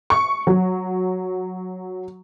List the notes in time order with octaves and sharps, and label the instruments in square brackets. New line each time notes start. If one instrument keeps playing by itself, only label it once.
[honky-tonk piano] C#6
F#3